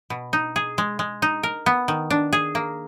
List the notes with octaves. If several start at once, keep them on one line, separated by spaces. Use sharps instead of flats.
B2
D#4
G#4
G#3
G#3
D#4
A#4
B3
D#3
D4
G#4
A#3